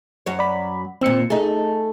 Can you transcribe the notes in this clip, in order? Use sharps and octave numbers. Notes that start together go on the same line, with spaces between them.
F#2 F#3 C#5
D5 B5
D#2 A#2 C4 E6 C#7
A3 D#4 G#4